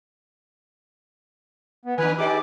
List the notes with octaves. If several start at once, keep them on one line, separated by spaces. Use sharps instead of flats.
B3
D#3 D4 B4 G#5
D#4 G4 G#4 D5 D6